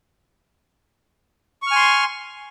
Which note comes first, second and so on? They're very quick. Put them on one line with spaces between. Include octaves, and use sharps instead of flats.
C#6 F6 G#5 C6